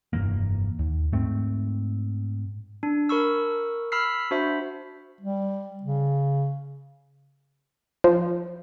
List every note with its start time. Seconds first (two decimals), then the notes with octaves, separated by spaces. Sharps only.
0.13 F1 G2 E3 A#3
0.79 D#2
1.12 G#2 A3 C4
2.83 D4
3.09 A#4 B5 C#6 E6
3.92 B5 E6 F6 B6 C7
4.31 D4 F#4 C5 E5 B5
5.21 G3
5.83 C#3
8.04 F3